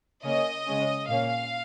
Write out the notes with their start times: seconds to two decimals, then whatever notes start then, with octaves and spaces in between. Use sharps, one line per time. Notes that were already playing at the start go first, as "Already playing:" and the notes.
0.24 C#3 A#3 C#4 D#5
0.67 C#3 G#3 C#4
1.08 A#2 A#3 C#4 F5